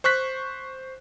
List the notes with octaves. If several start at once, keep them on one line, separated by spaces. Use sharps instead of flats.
C5 C#6 F#6 B6